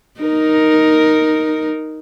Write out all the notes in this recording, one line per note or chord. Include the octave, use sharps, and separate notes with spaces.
D#4 A#4